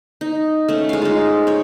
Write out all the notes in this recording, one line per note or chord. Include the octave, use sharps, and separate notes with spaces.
D#4
A3 C#4
G#3 F5
D#4 F4
C#5 G5